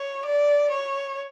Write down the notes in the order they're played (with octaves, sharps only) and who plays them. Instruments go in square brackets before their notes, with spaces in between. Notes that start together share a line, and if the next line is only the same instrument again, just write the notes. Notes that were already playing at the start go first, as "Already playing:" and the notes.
Already playing: [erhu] C#5
D5
C#5